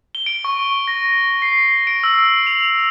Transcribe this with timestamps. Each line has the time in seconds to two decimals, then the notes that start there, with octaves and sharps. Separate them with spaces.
0.15 G7
0.26 D7
0.45 C#6
0.88 A#6
1.42 C7
1.87 D7
2.04 E6
2.47 F7